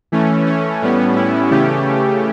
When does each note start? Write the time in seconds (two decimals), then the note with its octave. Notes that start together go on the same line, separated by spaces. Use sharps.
0.12 E3 A3 C#4
0.46 C#4
0.82 A2 G3 B3
1.16 E4
1.51 C#3 E3 A3 C#4 G4